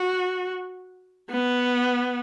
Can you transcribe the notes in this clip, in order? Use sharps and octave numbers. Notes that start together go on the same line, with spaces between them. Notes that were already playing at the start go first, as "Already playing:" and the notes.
Already playing: F#4
B3